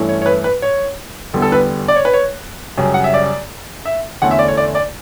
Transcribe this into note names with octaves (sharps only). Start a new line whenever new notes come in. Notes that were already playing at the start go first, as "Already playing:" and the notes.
Already playing: G2 E3 A3 C#4 E4
C#5
C#5
B4
B4
C#5
E2 D3 G3 B3
A4
B4
D5
C#5
B4
C#5
F#2 C#3 G3
F#5
E5
D5
E5
E2 D3 A3 C#4 F#5
E5
D5
C#5
D5
D5